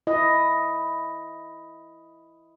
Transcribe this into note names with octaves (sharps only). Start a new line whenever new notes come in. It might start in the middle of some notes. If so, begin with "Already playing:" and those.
E4 D#5